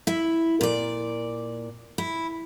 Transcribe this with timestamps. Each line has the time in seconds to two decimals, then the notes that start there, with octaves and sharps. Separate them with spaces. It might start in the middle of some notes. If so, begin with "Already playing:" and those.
0.07 E4 E5
0.61 A#2 D5
1.98 E4